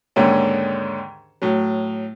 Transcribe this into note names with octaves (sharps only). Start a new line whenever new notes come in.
D#2 G#2 D3 D#3 C#4
A2 F#3